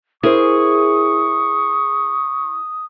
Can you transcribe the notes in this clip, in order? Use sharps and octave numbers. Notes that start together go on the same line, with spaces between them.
E4 G#4 A#4 C5 C#6 D#6